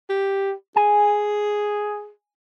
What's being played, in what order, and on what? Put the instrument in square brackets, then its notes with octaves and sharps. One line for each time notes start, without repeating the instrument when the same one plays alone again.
[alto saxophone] G4
[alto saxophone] G#4 [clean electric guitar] G#5